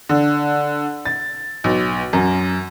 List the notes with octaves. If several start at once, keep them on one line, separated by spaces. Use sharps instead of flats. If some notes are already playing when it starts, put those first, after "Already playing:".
D3
A6
B1
F#2